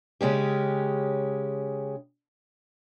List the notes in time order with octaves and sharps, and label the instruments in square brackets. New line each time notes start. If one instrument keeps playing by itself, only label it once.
[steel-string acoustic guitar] C#3 G#3 C#4 G4